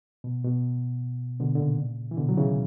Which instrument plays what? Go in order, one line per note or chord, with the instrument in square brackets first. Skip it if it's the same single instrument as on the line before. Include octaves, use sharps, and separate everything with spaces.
[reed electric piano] B2
B2
B2 D3
D3
A#2 C#3
E3
B2 D3
F#3
C#3 E3